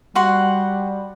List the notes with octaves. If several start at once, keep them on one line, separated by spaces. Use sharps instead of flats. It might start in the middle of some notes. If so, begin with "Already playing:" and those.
G3 F#4 F#5 C6